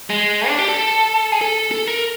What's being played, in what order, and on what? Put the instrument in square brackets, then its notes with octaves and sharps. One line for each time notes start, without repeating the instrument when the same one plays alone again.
[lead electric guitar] G#3
D4
G4
A4
G#4
A4
A4
A#4